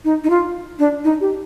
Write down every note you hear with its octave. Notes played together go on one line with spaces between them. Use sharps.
D#4
D#4
F4
D4
D#4
G4